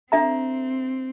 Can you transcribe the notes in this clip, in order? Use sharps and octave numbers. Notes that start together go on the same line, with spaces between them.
C4 D4 A4 E5 A#5